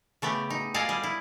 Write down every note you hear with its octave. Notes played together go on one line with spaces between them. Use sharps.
C#3 A3 B3 G4
D#4
G#4 A4 D5 D#5 F5
G3 G#4
E4